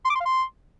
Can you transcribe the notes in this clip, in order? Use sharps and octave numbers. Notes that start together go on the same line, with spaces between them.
C6
D6
C6
F5
C6